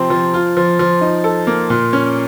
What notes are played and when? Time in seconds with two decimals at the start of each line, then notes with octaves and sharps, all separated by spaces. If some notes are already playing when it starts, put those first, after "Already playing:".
Already playing: C3 F3 C4
0.10 F3
0.34 F4
0.57 F3
0.79 F3
1.01 D#4
1.24 A4
1.47 A#3
1.70 A#2
1.93 C#4